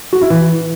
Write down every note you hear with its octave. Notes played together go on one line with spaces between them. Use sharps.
F#4
E4
E3